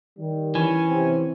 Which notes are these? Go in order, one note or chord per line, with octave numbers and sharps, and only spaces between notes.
D#3 G3
E3 C#4 G#5
C3 C4